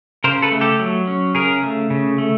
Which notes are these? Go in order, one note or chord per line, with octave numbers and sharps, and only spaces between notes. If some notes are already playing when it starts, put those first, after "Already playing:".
C#3 A#4 C5
A4 B4
A3
G4 A4
F#3
C#4
C#3 G#4 A#4
A3
C#3
A3